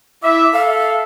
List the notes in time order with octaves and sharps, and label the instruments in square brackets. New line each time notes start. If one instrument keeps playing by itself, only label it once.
[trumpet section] E4 E5 [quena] D6
[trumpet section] A4 E5 [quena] F5